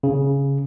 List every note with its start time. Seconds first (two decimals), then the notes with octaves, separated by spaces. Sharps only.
0.03 C#3